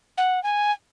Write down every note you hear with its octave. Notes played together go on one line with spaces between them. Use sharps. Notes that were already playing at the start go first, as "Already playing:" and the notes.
F#5
G#5